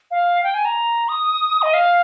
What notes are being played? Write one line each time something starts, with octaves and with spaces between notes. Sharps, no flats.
F5
G5
G#5
A#5
D#6
D#5
F5